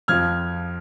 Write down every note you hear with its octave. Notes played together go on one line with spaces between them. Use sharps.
F2 F3 F6 G#6